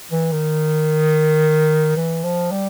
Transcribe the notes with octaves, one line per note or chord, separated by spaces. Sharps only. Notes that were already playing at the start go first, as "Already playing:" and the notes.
E3
D#3
E3
F3
G3